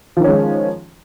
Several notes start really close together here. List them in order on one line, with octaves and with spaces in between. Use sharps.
F3 D#3 C#4 G#3